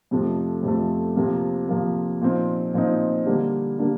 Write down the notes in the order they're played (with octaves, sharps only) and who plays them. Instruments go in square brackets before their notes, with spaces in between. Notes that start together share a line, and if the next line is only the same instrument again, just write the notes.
[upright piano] F2 C3 F3 A3
F2 C3 F3 A3
C3 F3 A#3
C3 F3 A#3
A#2 F3 C4 D#4
A#2 F3 C4 D#4
D3 G3 A#3 D4
D3 G3 A#3 D4